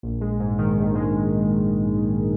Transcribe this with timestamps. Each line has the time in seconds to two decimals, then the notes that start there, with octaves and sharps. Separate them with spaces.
0.03 A#1
0.21 G#3
0.40 G#2
0.58 D#3
0.78 A#1
0.95 G#3